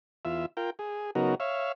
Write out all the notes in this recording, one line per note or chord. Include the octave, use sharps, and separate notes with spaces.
E2 F4 E5
F4 A#4 G5
G#4
C#3 F#3 B3 D#4 F#4 A#4
C#5 E5 F5